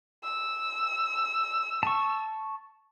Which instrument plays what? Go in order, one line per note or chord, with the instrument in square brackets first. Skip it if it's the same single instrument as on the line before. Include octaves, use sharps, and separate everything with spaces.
[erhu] E6
[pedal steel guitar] A5 C#6